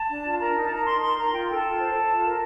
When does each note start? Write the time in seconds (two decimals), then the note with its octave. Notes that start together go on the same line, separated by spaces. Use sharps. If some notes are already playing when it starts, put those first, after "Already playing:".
Already playing: A5
0.09 D4
0.25 F4
0.40 A#4 A#5
0.56 D#4
0.63 A5
0.71 A#4 A#5
0.86 D#4 C6
1.01 A#4 C6
1.17 A#4 A#5
1.32 F4 G5
1.48 A4
1.55 A5
1.64 F4
1.79 C5
1.93 A4
2.10 F4
2.25 A#4